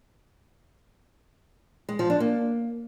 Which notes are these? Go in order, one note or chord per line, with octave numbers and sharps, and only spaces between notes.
G#3
F3
D4
A#3